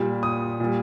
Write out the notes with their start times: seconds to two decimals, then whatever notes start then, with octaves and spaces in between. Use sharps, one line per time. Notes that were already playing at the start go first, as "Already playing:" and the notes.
Already playing: A#2 G3
0.23 D#6
0.60 A#2 G3